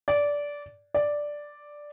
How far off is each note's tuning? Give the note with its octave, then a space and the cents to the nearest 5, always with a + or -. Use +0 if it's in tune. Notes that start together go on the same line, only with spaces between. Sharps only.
D5 -15
D5 +0